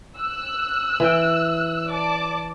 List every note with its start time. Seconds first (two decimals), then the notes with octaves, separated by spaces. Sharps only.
0.18 E6 F#6
1.00 E3 G5
1.91 D5 A5 D6